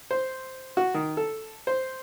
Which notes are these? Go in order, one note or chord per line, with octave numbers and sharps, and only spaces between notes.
C5
F#4
D#3
A4
C5